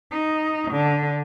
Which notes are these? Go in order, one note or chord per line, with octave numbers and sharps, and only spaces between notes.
D#4
D3